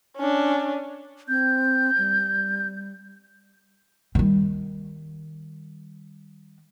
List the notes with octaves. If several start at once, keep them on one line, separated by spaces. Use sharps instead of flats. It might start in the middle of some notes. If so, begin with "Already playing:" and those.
C#4 D4
C4 G6
G3
D#3 G3